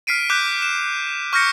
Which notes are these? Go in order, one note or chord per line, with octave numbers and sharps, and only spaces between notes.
F6 B6 C7 D7 D#7
D6 F#6 G6 B6
E7
C#6 F6 G6 A#6 C#7